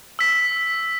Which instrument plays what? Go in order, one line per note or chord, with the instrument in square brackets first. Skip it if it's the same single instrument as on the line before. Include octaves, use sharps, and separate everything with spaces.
[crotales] E6 B6